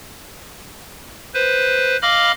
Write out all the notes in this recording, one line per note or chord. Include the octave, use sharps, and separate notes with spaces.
B4 C5
D#5 F5 B5 D6 F6